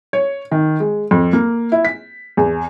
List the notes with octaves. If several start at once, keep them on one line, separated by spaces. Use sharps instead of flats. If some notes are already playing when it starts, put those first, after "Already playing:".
C#5
D#3
G#3
F2
A#3
E4
B6
E2